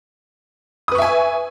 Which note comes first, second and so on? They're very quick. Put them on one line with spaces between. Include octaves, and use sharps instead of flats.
D#6 B4 C#6 E5 G#5